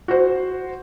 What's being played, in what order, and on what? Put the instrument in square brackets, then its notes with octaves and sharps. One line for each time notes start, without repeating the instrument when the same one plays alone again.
[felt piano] F#4 C5